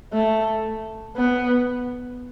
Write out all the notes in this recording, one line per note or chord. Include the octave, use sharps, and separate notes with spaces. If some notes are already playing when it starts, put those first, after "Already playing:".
A3
B3